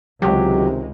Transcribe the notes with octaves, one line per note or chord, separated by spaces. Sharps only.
C#2 C3 D#3 F#3 G#3 G4